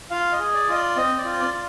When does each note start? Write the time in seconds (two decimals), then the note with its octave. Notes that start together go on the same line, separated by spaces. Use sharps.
0.11 F4 F5
0.32 D#5
0.39 G#4
0.54 D5
0.69 F4 D#5
0.75 D5
0.96 C4 D#5
1.18 D5
1.25 F4
1.40 D5
1.54 F4